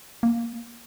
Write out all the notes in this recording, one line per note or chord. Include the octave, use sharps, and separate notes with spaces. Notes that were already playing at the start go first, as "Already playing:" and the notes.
A#3